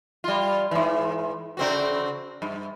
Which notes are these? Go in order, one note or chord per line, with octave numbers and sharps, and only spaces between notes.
G3 F4
G#2 E3
C#3 C4 F#4
G2